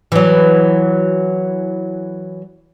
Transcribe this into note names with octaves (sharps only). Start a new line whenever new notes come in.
E3 F#3